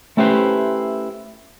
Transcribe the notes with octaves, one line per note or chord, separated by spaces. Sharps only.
A3 C#4 E4 G4 B4 C5